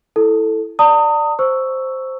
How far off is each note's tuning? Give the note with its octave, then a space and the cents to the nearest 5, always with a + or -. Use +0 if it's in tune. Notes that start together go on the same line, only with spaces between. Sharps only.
E4 +0 A4 +0
D5 +0 A#5 -45 D#6 +5
C5 +0 C#6 +10 E6 +0